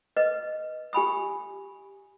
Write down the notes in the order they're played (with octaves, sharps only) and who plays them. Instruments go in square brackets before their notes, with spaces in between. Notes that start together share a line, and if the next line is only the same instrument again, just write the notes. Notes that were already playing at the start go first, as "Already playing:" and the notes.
[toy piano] B4 D#5
G4 G#5 B5 D#6